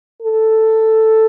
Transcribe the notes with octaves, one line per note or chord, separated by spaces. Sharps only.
A4